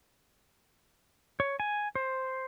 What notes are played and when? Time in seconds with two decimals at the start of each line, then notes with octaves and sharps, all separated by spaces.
1.40 C#5
1.60 G#5
1.95 C5